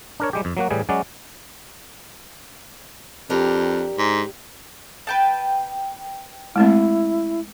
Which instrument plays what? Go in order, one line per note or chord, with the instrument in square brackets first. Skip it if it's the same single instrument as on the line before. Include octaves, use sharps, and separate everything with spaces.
[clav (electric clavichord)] D4 A#4 C#5
G3 G#3 G4
F2
F#3 A#3 F#4
A2 E3 G3 G#4
F#3 G#3 C#4 F#4 D5
[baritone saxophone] F2 [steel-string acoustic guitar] D4 G4 A#4
[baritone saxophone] G#2
[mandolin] B4 G5 A5
[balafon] G#3 A3 C4 [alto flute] E4